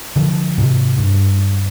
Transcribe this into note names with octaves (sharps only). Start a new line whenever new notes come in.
D3 F3
G#2 C3
G2